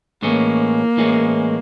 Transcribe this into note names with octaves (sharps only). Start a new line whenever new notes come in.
A2 E3 G#3 A#3 C#4
A2 E3 G#3 C#4